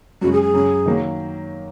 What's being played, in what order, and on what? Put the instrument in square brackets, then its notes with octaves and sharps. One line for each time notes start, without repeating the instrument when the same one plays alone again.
[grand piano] F#2 C#3 G#3 [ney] F#4
[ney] G#4
G#4
[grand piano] F#2 C#3 F#3
D#3 F#3 A#3